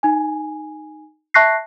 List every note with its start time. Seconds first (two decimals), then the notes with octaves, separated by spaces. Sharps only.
0.03 D#4 G#5
1.34 E5 A5 C#6 F#6 A#6 C7